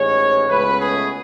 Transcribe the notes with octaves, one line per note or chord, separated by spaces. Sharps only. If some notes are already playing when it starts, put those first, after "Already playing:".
Already playing: A1 G#2 G#3 C#5
C#2 B2 A3 C#4 B4
G#4